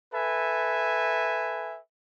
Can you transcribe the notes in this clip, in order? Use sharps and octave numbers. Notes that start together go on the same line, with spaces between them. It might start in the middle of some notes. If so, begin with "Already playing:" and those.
A4 B4 E5 G#5